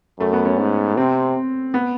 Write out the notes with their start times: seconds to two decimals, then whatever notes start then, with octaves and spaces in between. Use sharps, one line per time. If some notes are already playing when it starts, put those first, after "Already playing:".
0.20 F#2 A3
0.33 B3
0.45 C#4
0.59 G#2
0.97 C3 C4
1.74 B3